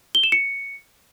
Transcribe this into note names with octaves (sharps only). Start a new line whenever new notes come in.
G7
E7
C#7